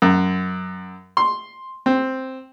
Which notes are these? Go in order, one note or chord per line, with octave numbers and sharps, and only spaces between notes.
F#2
C6
C4